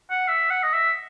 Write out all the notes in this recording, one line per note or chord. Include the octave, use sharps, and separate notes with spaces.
F#5
E5
F#5
D#5
E5